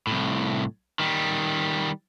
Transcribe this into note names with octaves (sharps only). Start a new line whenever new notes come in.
C2 A2
D#3 G3